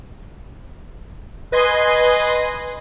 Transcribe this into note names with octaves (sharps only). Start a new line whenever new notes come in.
B4 D#5 G#5 C6